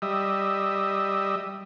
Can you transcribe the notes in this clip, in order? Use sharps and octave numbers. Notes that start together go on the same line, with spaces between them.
G3 D#5 E5